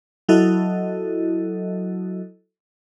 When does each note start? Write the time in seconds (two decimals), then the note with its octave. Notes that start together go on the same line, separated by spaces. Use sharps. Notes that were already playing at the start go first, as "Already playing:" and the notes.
0.29 F#3 E4 F#4 A4 D#5